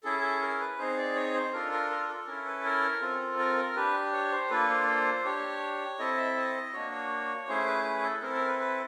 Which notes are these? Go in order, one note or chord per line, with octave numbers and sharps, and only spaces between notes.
C#4 E4 G#4 A4
A4
A#4
B4
C4 D#4 G#4 C5
D5
C#5
C5
D4 F4 A4 A#4
A#4
A#4
A4
C#4 E4 A4 A#4
B4
A#4
C4 F4 A4
A#4
A#4
D4 G4 B4
C#5
C5
A#3 D4 F4 A4 B4
C5
C5
D4 G4 C#5
C4 E4 A4 D#5
E5
D#5
A#3 D4 F#4 C#5
C#5
A3 C#4 E4 G#4 C5
B4
B4
A4
C4 E4 A4 A#4
A#4
B4
B4